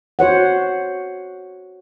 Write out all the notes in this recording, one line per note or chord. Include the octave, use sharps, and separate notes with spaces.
F#4 C5 C#5 F#5